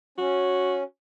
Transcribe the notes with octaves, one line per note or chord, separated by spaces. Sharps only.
C#4 F#4